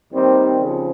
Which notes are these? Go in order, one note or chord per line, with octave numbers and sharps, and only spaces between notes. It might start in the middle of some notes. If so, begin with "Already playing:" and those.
D#2 D#3 G3 C4
C#3 F3